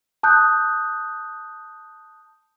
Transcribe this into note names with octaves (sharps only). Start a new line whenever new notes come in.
A5 D#6 F#6 G6